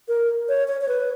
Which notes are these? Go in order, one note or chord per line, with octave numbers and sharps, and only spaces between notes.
A#4
C#5
C#5
C#5
B4